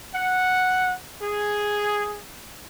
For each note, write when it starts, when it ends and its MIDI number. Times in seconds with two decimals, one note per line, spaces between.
0.14 0.94 78
1.22 2.20 68